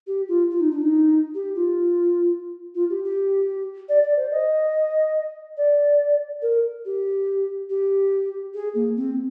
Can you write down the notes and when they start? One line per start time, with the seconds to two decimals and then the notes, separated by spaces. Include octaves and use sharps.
0.07 G4
0.28 F4
0.50 F4
0.60 D#4
0.71 D4
0.81 D#4
1.34 G4
1.55 F4
2.75 F4
2.90 G4
3.04 G4
3.89 D5
4.03 D5
4.17 C5
4.31 D#5
5.57 D5
6.42 A#4
6.85 G4
7.70 G4
8.54 G#4
8.75 A#3
8.96 C4